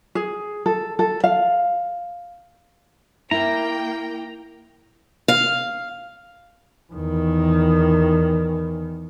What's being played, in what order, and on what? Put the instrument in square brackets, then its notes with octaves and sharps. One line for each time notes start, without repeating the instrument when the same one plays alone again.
[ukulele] G#4
A4
A4
F5
[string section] A#3 G5 [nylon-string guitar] E4 [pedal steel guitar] A#5
[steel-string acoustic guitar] F5
[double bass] E2 D#3